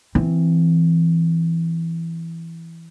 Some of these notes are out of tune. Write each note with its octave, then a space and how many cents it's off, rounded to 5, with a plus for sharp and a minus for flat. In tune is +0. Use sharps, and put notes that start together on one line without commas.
E3 +10 C4 +0